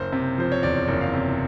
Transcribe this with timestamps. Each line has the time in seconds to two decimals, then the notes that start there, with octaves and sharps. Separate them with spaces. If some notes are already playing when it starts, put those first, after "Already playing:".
Already playing: F#1 C5
0.12 C3
0.38 F3 C5
0.52 C#5
0.63 E2 D5
0.88 F#1
1.01 F5
1.13 C3